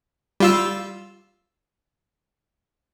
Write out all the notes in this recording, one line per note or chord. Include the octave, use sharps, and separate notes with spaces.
G3 F4 E6